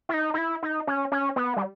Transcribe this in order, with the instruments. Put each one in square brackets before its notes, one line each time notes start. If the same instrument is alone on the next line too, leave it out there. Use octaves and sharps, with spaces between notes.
[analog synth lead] E4
D#4
D#4
E4
D#4
C#4
C#4
B3
G3